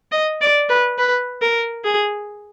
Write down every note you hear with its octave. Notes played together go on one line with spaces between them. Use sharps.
D#5
D5
B4
B4
A#4
G#4